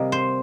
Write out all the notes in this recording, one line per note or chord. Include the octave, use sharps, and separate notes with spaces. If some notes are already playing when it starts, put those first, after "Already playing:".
Already playing: C3 G3 A#3 D#5
C5